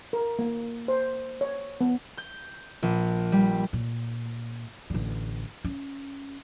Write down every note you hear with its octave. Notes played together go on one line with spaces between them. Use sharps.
A#4
A#3
C5
C#5
B3
G6
A#1
G3
A#2
A1 D3
C#4